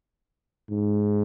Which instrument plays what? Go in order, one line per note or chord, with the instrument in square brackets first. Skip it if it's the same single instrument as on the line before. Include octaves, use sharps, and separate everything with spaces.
[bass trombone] G#2